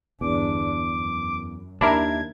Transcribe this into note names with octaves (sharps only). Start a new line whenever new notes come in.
G1 E2 D4 D6
F#2
D#2 D4 E4 A#4 G#6